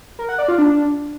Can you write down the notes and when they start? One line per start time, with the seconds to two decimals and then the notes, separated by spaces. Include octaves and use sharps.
0.19 A#4
0.29 F#5
0.39 D5
0.48 F4
0.58 D4